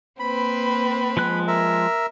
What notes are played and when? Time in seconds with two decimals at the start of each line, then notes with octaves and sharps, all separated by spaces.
0.19 A#3 C4 B4 B5
1.17 F3 G#3 F#6
1.48 A#4 E5